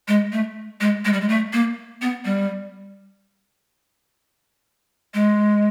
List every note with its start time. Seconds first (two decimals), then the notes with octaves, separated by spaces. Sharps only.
0.08 G#3
0.33 A3
0.81 G#3
1.05 G#3
1.13 G3
1.21 G#3
1.29 A3
1.53 A#3
2.02 B3
2.25 G3
5.14 G#3